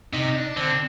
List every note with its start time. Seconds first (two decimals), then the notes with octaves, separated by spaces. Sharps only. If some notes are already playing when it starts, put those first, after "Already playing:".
0.13 C3 D#4
0.36 D4
0.57 D3 C4